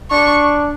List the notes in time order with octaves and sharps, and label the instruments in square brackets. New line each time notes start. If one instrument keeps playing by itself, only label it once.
[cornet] D4 [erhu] C#6